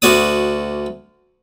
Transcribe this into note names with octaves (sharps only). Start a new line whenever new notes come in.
D2 F#4 D5 D#6